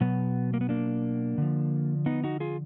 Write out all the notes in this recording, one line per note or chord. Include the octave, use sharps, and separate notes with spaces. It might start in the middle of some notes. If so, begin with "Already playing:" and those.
B2 F#3 B3
A#3
B3
A#3 D4
D3 F3
B3 D#4
D#4 F#4
F4 G#4